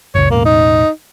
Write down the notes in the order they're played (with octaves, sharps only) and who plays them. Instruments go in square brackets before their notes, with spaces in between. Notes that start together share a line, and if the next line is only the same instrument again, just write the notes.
[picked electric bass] F#1 C#2 [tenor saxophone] C#5
[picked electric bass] E1 A1 [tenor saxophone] A#3
[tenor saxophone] D#4